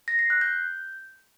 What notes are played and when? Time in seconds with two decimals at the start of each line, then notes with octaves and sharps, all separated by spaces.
0.08 A#6
0.19 C7
0.30 F#6
0.41 G6